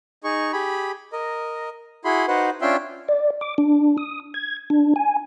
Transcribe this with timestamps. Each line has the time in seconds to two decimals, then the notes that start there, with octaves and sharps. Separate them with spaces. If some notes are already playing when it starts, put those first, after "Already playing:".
0.24 D#4 G#4 C#6
0.53 G4 G#4 B5
1.13 A#4 D#5
2.05 E4 F#4 G#4 B5 C6
2.28 D#4 F#4 B4 C5 F#5
2.62 C#4 D4 F4 E5 G5 C6
3.09 D5
3.41 D6
3.58 D4
3.98 D#6
4.34 G#6
4.70 D4
4.96 G#5